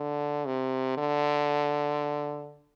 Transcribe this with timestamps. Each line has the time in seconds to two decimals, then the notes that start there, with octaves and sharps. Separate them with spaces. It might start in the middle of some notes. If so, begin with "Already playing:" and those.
Already playing: D3
0.46 C3
0.98 D3